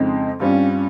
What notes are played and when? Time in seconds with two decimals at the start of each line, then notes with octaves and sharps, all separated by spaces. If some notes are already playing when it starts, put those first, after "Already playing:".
Already playing: F2 C#3 G#3 C4 D#4
0.40 G2 G3 C4 C#4 F4